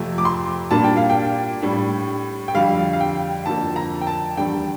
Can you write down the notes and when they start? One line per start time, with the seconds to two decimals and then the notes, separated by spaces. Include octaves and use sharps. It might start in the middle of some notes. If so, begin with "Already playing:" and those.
Already playing: F2 C3 F3 A3
0.18 D6
0.25 C6
0.71 A#2 G3 A#3 D4 A5
0.84 G5
0.97 F5
1.10 G5
1.62 A2 G3 D4
2.48 G5
2.54 F2 D3 G3 F5
2.93 F5
3.01 G5
3.46 F2 D3 F3 A#3 A5
3.76 A#5
4.01 G5
4.07 A5
4.37 E2 D3 G3 D4 G5